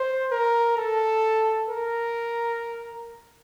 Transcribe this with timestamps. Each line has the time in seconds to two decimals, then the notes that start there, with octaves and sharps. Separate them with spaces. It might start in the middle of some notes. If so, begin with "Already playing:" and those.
Already playing: C5
0.31 A#4
0.77 A4
1.68 A#4